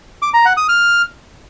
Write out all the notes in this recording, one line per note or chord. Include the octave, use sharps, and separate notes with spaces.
D6
A#5
F#5
D#6
F6